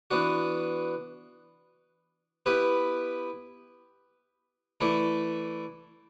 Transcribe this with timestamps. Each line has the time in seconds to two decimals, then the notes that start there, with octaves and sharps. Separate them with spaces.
0.11 E3 B3 D4 F#4
2.46 B3 E4 G4 B4
4.81 E3 A3 E4 A4 D5